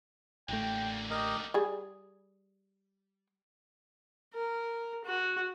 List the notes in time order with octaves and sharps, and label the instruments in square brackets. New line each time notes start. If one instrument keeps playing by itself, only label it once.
[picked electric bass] A1 A3 [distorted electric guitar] D3 A#3 [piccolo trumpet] G5
[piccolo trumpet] G4 [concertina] A#4 D#5
[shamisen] G3 G#4
[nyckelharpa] A#4
F#4